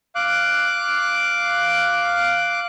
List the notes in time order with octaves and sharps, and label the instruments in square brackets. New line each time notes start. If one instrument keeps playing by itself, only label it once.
[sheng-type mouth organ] F5 D6 F#6